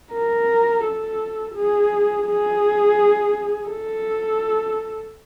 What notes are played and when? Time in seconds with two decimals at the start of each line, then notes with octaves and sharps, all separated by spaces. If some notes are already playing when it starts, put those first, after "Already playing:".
0.13 A#4
0.84 A4
1.55 G#4
2.27 G#4
3.69 A4